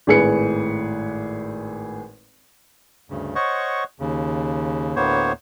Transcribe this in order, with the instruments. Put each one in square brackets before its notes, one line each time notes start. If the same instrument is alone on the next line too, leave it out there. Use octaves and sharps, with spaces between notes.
[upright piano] G#1 A2 G#4 B4 C#7
[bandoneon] D2 G2 C#3
C5 C#5 D#5 F#5 C#6
D#2 C#3
D2 A2 A#3 B3 C5 C#5